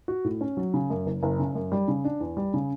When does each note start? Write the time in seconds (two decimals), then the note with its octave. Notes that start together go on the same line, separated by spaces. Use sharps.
0.08 F#4
0.24 A2
0.41 C#4
0.57 F#3
0.74 C#3
0.90 F#2
1.06 F#1
1.23 F#1
1.39 C#3
1.55 F#2
1.72 G3
1.88 C#3
2.04 D4
2.21 E2
2.37 G3
2.54 C#3